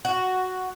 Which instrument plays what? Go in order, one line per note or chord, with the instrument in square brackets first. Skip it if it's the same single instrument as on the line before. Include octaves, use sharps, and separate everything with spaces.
[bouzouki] F#4